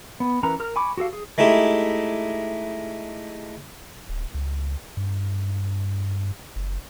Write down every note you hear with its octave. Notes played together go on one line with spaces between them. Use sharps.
B3
E3 C#4 A#4 B4 A#5
A#4 F6
G#5 B5 C#6 D6
F#4 G4 A4 F5
G#4
G#3 A3 D#4 E4 G4
D1
C#2
G2
F#1